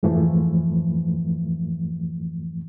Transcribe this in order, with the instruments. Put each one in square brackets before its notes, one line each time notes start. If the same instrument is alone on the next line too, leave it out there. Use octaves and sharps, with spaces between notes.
[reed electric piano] F2 G#2 E3 F3 A3